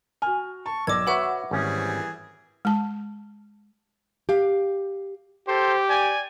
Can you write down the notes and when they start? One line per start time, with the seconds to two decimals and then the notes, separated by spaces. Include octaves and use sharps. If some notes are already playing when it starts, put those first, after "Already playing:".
0.22 F#4 G#5 F6
0.66 A5 C#6
0.87 B1 D5 D6 E6 G#6 A#6
1.07 F#4 B4 C#5 E5 F#5 B5 C#6 D6
1.51 G#1 E3 G3 C#4 G#4
2.65 G#3 A5
4.29 G4 F5
5.48 G4 A4 C5
5.88 D5 G#5